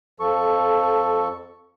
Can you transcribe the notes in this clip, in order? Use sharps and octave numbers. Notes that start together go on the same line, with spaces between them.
F2 F3 A4 C#6